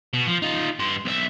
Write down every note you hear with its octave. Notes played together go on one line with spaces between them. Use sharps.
B2
F3
D#4 F4
G2 C6
B1 E5